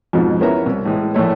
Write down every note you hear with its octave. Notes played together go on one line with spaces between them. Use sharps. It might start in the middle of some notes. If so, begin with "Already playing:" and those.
F2 G#2 B2 F3
B3 C#4 E4 A#4 E5 A#5
C2
A2 E3 G#3
A#1 A2 A3 C#5